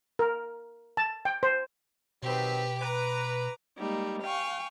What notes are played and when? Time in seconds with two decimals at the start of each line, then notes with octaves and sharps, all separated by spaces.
0.19 A#4
0.97 A5
1.25 G5
1.43 C5
2.23 B2 D#3 F#3 C4 G4 B4
2.80 B4 A#5 D6
3.78 G3 G#3 A#3 D#4
4.23 F5 G5 G#5 C#6